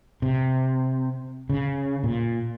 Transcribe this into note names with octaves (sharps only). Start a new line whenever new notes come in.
C3
C#3
A#2